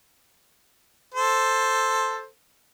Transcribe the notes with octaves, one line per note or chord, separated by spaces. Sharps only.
A4 C5